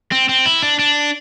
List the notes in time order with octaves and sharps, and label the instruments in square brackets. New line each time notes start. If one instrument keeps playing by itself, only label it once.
[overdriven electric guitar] C4
C4
E4
D4
D4